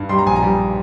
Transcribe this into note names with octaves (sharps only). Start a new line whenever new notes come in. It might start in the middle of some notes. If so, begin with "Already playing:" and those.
Already playing: G2
G3 C6
A#5
A#1 G#5
A#5
G3